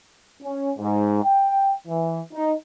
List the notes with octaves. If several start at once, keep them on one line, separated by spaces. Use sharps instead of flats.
C#4
G#2
G5
E3
D#4